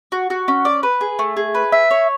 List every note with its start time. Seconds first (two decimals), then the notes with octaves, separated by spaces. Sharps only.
0.12 F#4
0.30 F#4
0.48 C#4
0.65 D5
0.83 B4
1.01 G#4
1.19 A3
1.37 G#4
1.54 B4
1.72 E5
1.91 C#5